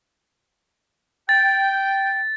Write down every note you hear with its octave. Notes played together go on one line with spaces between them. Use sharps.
G5 A6